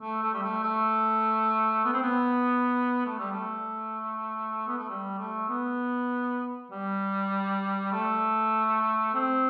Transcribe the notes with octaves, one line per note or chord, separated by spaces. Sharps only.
A3
A3
G3
A3
A3
B3
C4
B3
A3
G3
A3
B3
A3
G3
A3
B3
G3
A3
C4